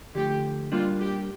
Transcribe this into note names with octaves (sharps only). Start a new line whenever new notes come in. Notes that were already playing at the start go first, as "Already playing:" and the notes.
D3 F3 A3 G4
A#2 G3 A#3 D4 F4
G4